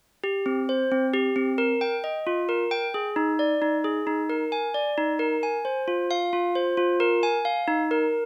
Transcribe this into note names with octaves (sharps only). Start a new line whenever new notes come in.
G4
C4
C5
C4
G4
C4
A#4
G5
D#5
F4
A#4
G5
G#4
D#4
D5
D#4
G#4
D#4
A#4
G#5
D5
D#4
A#4
G#5
C5
F4
F5
F4
C5
F4
A#4
G#5
F5
D#4
A#4